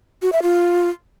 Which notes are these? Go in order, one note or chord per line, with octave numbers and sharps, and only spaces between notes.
F#4
E5
F4